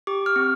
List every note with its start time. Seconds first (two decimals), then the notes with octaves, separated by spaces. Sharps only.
0.07 G4 D6
0.26 F6
0.36 C4